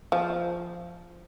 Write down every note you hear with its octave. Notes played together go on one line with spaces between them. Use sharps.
F3